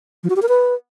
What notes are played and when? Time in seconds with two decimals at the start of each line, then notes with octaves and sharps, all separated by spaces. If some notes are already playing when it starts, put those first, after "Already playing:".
0.24 F3
0.30 F#4
0.36 G4
0.42 A#4
0.49 B4